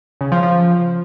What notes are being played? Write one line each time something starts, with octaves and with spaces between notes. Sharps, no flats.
C#3
F3
F3